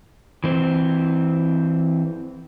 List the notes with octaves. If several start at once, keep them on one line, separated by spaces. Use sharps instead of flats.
E3 C4